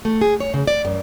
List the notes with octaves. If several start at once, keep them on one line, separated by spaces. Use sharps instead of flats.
A3
G#4
C#5
C#3
D5
F#2